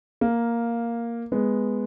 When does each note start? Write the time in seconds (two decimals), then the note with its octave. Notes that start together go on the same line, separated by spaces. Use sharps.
0.21 A#3
1.32 G#3 B3